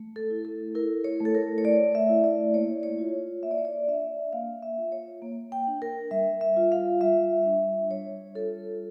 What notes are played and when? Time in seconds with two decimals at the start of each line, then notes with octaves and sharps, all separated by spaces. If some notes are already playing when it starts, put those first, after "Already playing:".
Already playing: A3
0.16 A4
0.30 E4
0.45 A4
0.75 E4 A#4
1.04 C#5
1.20 A3
1.25 A4
1.35 A#4
1.58 C#5
1.64 A3 D5
1.95 E5
2.09 E4
2.24 D5
2.53 A#3 C#5
2.83 C#5
2.99 F4
3.43 A#3 E5
3.51 D5
3.58 C#5
3.65 D5
3.88 D4 E5
4.33 A#3 F5
4.63 E5
4.78 F4
4.92 C#5
5.22 A#3
5.52 G5
5.67 D4
5.82 A#4
6.11 G3 E5
6.41 E5
6.57 F4
6.72 F5
7.01 G3 E5
7.46 D4
7.91 G3 C#5
8.35 F4 A4